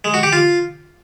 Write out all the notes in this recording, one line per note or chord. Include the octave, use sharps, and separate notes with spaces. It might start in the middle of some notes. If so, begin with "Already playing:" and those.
G#3
F#4
G4
F4